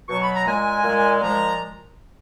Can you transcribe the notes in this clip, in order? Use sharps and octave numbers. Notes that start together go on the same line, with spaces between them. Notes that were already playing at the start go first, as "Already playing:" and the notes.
B2 F#3 C#6
B5
A#5
A#2 G#3 G#5
A#2 G#3
A#2 F3 G#3 A#5